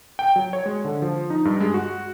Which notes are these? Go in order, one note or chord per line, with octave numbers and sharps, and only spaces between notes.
G5
F#3
C#5
G#3
D3
F3
D#4
G2
G#3
F#4